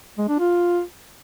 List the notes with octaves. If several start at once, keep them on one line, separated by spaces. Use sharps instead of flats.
G#3
D4
F4